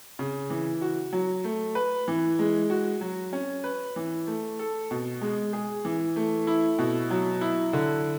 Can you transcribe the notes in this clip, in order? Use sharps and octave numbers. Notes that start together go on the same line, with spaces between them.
C#3
E3
F#4
F#3
A3
B4
E3
G#3
F#4
F#3
C#4
B4
E3
A3
A4
B2
G#3
G#4
E3
A3
E4
B2
F#3
E4
D3